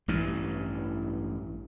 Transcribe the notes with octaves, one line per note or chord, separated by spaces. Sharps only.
A1 G2 E3